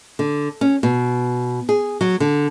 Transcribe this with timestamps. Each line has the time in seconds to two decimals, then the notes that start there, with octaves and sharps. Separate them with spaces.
0.19 D3
0.61 C#4
0.83 B2
1.69 G#4
2.01 F#3
2.20 D3